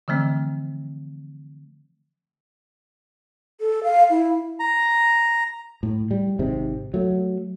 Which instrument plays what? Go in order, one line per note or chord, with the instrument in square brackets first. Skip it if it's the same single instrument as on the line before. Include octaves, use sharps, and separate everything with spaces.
[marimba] D3 E3 F3 A3 C4
[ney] A4
F5
E4
[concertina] A#5
[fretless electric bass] A2
G3
G#1 G#2 C3
F#3 A3